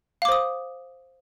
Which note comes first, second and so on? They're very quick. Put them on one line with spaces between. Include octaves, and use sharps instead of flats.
F5 D6 C5 D#6